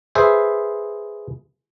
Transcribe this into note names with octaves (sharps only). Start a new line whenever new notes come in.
G#4 B4 C5 E5